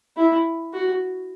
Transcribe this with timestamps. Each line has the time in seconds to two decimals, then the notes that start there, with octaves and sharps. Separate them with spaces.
0.17 E4
0.73 F#4